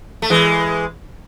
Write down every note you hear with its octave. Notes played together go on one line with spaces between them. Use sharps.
A3
E3 G#3